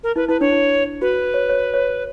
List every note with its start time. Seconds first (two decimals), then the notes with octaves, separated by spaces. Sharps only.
0.03 A#4
0.16 E4 B4
0.28 E4 B4
0.41 D4 C#5
0.52 E4
1.02 F#4 B4
1.34 C#5
1.49 C#5
1.74 C#5